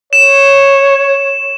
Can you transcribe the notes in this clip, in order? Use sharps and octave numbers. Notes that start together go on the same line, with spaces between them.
C#5 E7